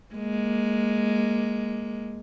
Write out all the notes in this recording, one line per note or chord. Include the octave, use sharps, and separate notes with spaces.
G#3 A#3